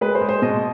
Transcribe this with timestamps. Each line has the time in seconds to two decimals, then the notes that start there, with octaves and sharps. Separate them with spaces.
0.01 G#3 B4
0.15 C5
0.21 G#3
0.29 C5
0.42 B2 D#5